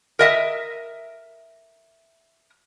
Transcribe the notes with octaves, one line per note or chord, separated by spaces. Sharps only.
A#4 D#5 E5